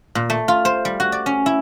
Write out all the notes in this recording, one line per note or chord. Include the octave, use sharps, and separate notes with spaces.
A#2
A3
F4
C5
G3
F#4
D5
C#4
E4